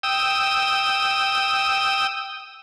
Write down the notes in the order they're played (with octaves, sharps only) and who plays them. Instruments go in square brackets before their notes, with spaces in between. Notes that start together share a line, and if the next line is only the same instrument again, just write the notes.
[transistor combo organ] G5 D#6 E6